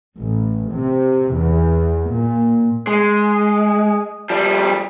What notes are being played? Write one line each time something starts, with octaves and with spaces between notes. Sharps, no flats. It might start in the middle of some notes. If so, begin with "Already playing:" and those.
A1
C3
E2
A#2
G#3
F3 G3